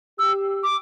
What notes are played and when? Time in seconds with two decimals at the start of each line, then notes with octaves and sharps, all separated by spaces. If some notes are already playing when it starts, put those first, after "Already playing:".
0.19 G4 E6
0.63 D6